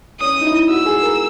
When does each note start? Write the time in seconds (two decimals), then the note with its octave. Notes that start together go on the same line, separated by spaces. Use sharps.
0.21 C#4 D#6
0.41 D#4
0.45 E4
0.69 F#4 E6
0.85 G#4
1.01 A#4